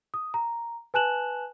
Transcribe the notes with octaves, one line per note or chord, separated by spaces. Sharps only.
D#6
A#5
B4 G#5 A5 F#6 E7 F#7